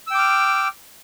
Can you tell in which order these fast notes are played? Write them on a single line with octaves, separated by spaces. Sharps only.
E6 G5 D6 F6